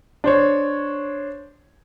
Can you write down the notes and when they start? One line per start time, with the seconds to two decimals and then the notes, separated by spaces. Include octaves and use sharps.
0.24 D4 C5 C#5